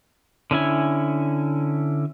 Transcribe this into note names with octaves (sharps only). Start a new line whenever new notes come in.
D3 C#4 E4 G#5